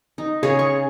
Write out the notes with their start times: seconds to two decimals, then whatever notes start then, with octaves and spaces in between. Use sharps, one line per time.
0.18 D#4
0.43 C#3 G#4 C#5
0.59 C#6